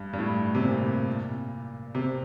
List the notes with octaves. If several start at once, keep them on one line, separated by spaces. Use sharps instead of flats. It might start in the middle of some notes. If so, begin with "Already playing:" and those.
Already playing: G2
G2
A2
C3
A#2
C3